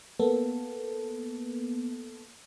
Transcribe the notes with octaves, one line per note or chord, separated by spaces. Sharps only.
A#3 B3 A4